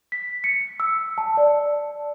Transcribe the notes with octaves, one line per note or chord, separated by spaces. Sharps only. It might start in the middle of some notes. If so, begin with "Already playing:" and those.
B6
C#7
E6
A5
D5